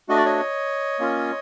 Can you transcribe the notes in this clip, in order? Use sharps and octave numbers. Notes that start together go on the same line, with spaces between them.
A3 D4 F#4 D#5
D5
C#5 D#5
A#3 C#4 F4